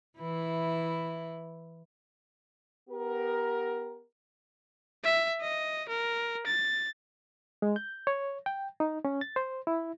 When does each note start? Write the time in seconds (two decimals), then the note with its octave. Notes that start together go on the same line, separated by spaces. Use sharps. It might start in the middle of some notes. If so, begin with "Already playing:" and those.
0.19 E3 E4
2.89 B3 G4 A#4
5.04 E5
5.41 D#5
5.89 A#4
6.47 A6
7.62 G#3
7.76 G6
8.07 C#5
8.46 G5
8.80 D#4
9.05 C#4
9.21 A6
9.36 C5
9.67 E4